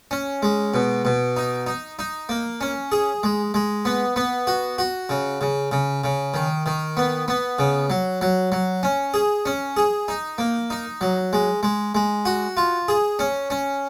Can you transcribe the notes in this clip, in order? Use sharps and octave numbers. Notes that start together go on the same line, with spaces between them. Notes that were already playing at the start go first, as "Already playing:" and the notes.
C#4
G#3
B2
B2
D#4
D#4
D#4
A#3
C#4
G#4
G#3
G#3
B3
B3
F#4
F#4
C#3
C#3
C#3
C#3
D#3
D#3
B3
B3
C#3
F#3
F#3
F#3
C#4
G#4
C#4
G#4
D#4
A#3
D#4
F#3
G#3
G#3
G#3
F#4
F4
G#4
C#4
C#4